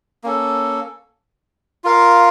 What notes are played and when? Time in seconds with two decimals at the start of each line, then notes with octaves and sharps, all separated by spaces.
0.24 A#3 C#4 A4
1.84 F4 A#4 F5